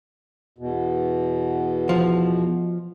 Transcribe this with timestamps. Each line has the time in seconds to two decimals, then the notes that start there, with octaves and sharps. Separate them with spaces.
0.58 E2 B2
1.89 F3